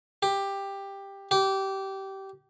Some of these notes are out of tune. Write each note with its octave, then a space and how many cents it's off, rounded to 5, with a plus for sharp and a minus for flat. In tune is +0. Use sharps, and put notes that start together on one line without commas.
G4 +10
G4 -20